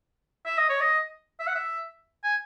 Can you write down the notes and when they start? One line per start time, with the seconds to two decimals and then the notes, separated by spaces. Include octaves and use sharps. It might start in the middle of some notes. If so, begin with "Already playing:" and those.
0.46 E5
0.58 D#5
0.70 C#5
0.81 D#5
1.40 E5
1.47 F#5
1.55 E5
2.24 G#5